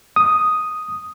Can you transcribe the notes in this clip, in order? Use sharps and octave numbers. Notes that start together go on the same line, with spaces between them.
D#6